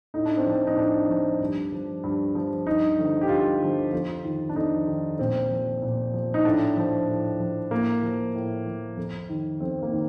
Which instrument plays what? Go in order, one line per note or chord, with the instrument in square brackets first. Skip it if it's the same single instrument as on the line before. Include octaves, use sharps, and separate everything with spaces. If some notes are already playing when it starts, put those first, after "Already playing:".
[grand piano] A2 D#4
D4
C4
F3 D4
D#4
A2 D4
F3
G2
F3
G2
F3
G2 D#4
D3 F3
G4
G2 F4
D3 F3
F2 F4
D#3
D4
F2 D#4
D#3
A#2 C4
F3
A#2
F3
D#4
A2 D4
F3
A2
F3
A2 A#3
F3
A2
F3
F2
D#3
F2 C4
A#3
D#3